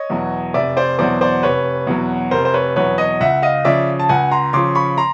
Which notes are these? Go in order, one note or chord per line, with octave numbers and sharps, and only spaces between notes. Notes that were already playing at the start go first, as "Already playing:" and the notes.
Already playing: C#5 D#5
E2 B2 F#3
F1 D5 E5
C5 D5
E2 B2 F#3 C5 D5
C5 D5
F1 B4 C#5
E2 B2 F#3
F1 A#4 C5
C5
B4 C#5
E2 B2 F#3 B4 C#5
C#5 D#5
C#2 E5 F#5
D#5 F5
C#3 F3 D5 E5
A5
C#2 F#5 G#5
A#5 C6
C#3 F3 C6 D6
B5 C#6
A#5 C6